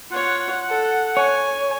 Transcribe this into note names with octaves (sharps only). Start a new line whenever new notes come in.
F4 C#5 F#5
A4
C#5 G#5